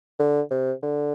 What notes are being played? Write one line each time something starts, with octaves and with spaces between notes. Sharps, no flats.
D3
C3
D3